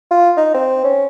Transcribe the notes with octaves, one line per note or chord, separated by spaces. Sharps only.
F4
D#4
C4
C#4